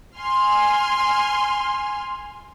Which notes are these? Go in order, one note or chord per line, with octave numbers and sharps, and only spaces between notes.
G#5 C6 F6